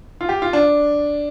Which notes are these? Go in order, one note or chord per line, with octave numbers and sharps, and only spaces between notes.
F4
G4
F4
D4